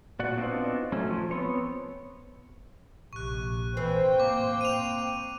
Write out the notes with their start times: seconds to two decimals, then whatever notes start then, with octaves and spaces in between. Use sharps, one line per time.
0.19 A#2 F#4 D5 F#5
0.37 B3 C4 D4 D#4 F4 F#4
0.92 F#3 A3 C#4
1.11 F3
1.31 B3 C4 C#5
3.13 A#1 C3 C#6 F#6
3.77 E3 C4 C5 G5
4.20 A#3 D6
4.61 D#7 F7